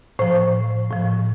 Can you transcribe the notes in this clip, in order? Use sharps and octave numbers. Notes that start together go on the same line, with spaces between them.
A2 F3 C5
A2 F3